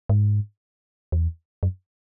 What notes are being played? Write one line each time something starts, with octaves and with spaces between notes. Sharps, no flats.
G#2
E2
F#2